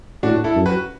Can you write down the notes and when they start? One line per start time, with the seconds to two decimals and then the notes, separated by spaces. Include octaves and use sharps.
0.23 A2 D4 F#4
0.44 E4 A4
0.55 F#2
0.66 F#4 B4